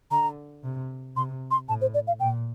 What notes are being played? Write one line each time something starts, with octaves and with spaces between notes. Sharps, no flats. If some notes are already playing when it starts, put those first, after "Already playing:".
D3 A#5
C3
C3 C6
C6
A2 A5
C5
D5
F5
A#2 G5